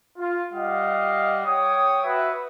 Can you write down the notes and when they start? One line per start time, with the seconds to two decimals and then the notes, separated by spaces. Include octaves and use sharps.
0.17 F4
0.53 G3 D#5 F5 F#5
1.45 C#5 G5 D#6
2.03 F#4 B4 E5